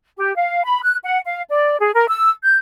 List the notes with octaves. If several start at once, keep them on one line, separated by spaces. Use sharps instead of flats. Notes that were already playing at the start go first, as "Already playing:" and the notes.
G4
F5
B5
F#6
F#5
F5
D5
G#4
A#4
E6
G6